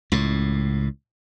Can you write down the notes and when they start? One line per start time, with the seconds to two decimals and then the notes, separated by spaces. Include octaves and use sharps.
0.12 C#2 A2